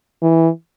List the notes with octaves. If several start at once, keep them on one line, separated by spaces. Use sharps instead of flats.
E3